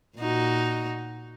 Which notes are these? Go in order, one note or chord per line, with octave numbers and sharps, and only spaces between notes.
A#2 D#4 F#4